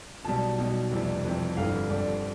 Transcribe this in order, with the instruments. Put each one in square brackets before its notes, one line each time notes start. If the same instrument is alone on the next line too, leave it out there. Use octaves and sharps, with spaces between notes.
[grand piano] B1 B2 G3 A5
B1 B2 G3
F1 F2 C3 E3 G3
F1 F2 C3 E3 G3
G1 F2 D3 G3 F5
G1 F2 D3 G3 D5